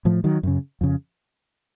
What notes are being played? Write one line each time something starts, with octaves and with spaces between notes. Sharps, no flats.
A2 F3
D#3 F#3
F#2 C#3
F2 C#3